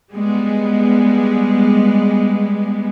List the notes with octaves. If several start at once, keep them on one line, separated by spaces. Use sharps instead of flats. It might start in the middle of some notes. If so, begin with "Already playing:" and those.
G3 G#3 B3